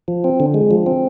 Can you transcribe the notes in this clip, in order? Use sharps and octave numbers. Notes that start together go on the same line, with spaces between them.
F3
C4
D3
G#3
F3
C4